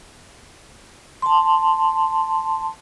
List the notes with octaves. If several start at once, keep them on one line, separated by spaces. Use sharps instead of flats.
A5 C6